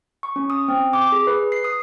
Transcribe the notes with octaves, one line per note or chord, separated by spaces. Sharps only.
C#6
C#4
D#6
C4
D6
G#4
B4
C7
D#6